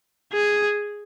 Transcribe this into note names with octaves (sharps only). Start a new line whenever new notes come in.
G#4